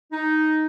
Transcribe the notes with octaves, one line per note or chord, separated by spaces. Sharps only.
D#4